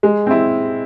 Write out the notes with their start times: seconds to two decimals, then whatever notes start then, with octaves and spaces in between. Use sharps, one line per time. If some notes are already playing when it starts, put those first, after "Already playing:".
0.03 G#3
0.26 C4 E4